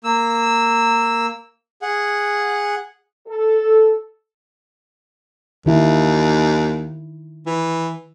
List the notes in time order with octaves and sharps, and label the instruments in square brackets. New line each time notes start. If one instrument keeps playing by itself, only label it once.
[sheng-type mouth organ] A#3 E6
G#4 F#5
[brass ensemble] A4
[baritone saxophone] D#2 [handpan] D#3 E4
[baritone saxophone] E3